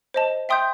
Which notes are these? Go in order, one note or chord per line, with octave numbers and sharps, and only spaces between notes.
C5 D#5 A5
E5 G5 C6 D#6 G6